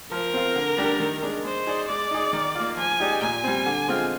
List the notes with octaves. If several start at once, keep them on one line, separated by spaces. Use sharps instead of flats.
F3 A#4
C4 F4
D3
G3 D4 G4
D#3
G#3 D4
G#3 C5
D#4 G#4 D5
G#3 D5
D#4 G#4
D#3
A#3 F4
F3 G#5
G#3 D#4 G4 D5
A#2 G#5
G3 C4
D3
G#3 C4 F4